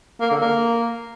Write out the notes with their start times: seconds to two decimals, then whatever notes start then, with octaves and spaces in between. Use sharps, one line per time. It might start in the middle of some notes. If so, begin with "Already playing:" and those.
0.21 A#3
0.31 D3
0.41 A#3